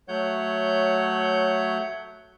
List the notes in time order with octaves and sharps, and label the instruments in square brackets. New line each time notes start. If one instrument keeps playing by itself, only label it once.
[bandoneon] F#3 A3 C#5 F#5 G6